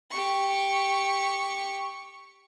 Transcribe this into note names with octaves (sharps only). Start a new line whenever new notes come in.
G4 C#6